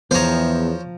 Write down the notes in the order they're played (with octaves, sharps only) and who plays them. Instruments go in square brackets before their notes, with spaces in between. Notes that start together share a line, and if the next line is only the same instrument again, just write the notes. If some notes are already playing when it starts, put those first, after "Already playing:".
[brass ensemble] E2 [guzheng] F3 A#5 [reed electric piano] B3 [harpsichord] C5 C#5